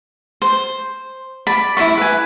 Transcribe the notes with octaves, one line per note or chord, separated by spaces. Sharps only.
C5
D5 B5
E4 B4 B5 C#6
B4 G#5